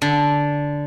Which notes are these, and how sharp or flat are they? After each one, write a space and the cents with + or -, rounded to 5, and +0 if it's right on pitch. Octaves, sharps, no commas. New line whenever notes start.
D3 -10